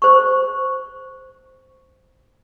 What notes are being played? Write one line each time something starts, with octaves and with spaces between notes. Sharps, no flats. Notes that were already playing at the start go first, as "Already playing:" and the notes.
C5 C#6